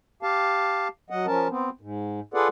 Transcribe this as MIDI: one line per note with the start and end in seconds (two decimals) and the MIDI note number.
0.23 0.88 67
0.23 0.88 77
0.23 0.88 81
1.10 1.26 54
1.10 1.26 75
1.10 1.26 78
1.26 1.48 53
1.26 1.48 61
1.26 1.48 70
1.26 1.48 81
1.50 1.70 59
1.50 1.70 60
1.81 2.20 44
2.34 2.48 65
2.34 2.48 68
2.34 2.48 69
2.34 2.48 71
2.34 2.48 74
2.34 2.48 78